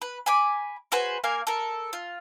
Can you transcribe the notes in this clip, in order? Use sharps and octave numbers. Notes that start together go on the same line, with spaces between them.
B4
G#5 B5 D6
F#4 G#4 B4 C5
A#3 A#4 F5 G#5
A4 A#4
F4